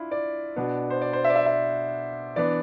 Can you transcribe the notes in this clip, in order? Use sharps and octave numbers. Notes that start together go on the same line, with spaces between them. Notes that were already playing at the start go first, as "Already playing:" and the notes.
Already playing: D4 E4 F4
D5
B2 B3 D4
C5
D5
C5
E5
D5
E5
E5
E3 B3 D4 D5